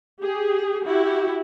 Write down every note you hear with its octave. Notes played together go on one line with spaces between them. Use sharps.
G4 G#4
E4 F#4 G4